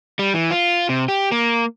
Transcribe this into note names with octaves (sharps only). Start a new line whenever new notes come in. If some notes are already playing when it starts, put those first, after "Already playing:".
G3
E3
F4
C3
G4
A#3